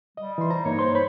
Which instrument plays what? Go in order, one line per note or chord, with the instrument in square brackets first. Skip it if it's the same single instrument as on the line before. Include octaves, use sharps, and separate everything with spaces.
[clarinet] G3 [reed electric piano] D#5
[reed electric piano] E3 C6
C5 A#5
[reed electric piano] G2 A#3 D#4 [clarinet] C#5
[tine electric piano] C5 C6
[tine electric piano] C5 [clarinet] B5